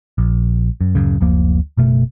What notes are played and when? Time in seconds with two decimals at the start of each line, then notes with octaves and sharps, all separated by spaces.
0.18 A#1
0.81 F#2
0.95 D1 G1 F#2 C#3
1.21 F#1 D2 F3 A#3
1.77 F#1 B2 A3